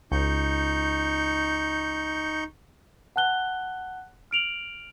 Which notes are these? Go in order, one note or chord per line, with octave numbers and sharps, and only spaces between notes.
C#2 D#4 C#6 G6
F#5 A5 F#6 G7
F6 D7 F7 F#7